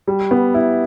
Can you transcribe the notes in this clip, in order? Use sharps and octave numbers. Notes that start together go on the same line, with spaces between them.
G3
B3
E4